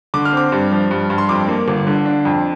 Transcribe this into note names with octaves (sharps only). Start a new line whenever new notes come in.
D3 D6
F6
C4 D6
G2
F3
G2
G2
C6
F2 D6
A#3
G1
D3
D4
F2